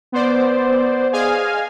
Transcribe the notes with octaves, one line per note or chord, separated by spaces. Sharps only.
B3 C5 D5
G#4 D#5 F5 G#5